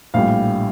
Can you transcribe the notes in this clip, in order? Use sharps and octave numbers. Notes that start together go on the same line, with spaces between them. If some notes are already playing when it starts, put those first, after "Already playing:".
A#1 A2 G3 F5